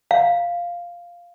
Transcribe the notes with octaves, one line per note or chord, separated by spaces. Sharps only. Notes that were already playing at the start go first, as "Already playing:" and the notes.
F5